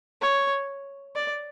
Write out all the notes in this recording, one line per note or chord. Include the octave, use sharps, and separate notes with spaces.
C#5
D5